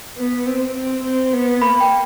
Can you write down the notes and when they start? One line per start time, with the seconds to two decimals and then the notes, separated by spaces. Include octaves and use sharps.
0.17 B3
0.46 C4
0.75 C4
1.04 C4
1.33 B3
1.61 A#3 B5
1.80 G5